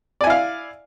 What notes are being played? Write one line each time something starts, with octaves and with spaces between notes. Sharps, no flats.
E4 D5 F5 G#5